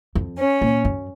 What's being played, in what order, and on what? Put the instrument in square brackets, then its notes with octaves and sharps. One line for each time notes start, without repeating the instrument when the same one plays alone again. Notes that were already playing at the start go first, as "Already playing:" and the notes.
[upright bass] F2
[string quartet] C#4
[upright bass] A#2
F#2